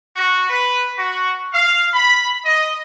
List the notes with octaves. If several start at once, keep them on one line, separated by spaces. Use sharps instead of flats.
F#4
B4
F#4
F5
B5
D#5